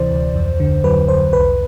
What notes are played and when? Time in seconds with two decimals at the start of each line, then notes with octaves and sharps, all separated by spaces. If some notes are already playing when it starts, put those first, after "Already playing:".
Already playing: D2 C3 E3 C5 D5
0.11 D2
0.36 F2
0.60 D3
0.84 F#3 B4
1.08 F2 C5
1.32 C2 B4